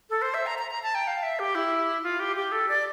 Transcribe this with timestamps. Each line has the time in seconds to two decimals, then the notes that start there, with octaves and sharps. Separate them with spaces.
0.10 A4
0.22 C5
0.34 E5
0.46 A#5
0.59 A#5
0.71 A#5
0.83 A5
0.95 G5
1.07 F5
1.23 E5
1.39 G4
1.55 E4
2.04 F4
2.20 G4
2.36 G4
2.52 A4
2.69 D5